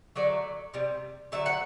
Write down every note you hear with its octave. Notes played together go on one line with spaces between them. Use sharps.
D3 F#3 A3 D5
C3 G3
D3 F#3 A3 E5
F#5